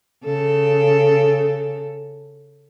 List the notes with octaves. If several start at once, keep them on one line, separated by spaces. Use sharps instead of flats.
C#3 A4